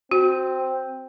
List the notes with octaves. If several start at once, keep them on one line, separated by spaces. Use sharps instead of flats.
C4 F#4